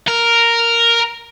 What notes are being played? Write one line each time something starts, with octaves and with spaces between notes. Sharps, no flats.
A#4